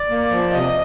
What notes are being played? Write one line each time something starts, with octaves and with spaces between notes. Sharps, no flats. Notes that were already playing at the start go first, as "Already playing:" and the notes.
Already playing: D5
A#3
F3
C3 D#5